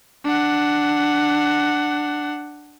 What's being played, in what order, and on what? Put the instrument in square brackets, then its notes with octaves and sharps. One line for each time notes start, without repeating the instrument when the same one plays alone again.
[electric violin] D4 F#5